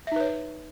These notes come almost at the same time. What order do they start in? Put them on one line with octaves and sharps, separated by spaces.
E5 D#4 B4 C#5